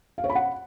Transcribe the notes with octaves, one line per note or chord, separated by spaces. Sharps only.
F5
C#5
B5
F#5